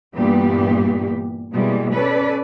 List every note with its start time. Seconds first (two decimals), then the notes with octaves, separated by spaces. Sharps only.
0.17 G2 A#2 E3 G3 B3 G4
1.53 B2 E3 G3 G#3 A#3
1.93 C#4 A4 B4 D5